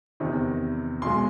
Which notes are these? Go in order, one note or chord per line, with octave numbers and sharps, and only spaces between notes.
E2 C3 D#3
B1 B2 G#3 C6